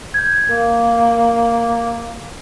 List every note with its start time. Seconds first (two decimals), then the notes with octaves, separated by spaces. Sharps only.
0.14 G6 G#6
0.49 A#3 A#4